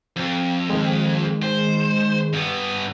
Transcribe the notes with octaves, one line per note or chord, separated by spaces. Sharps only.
F2
D#3 G#3
C5
G2 B3